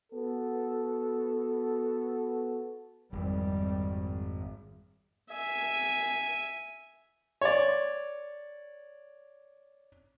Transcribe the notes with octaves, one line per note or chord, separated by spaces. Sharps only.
B3 F#4 A4
G#1 F2 G3
E5 G#5
C#5 D5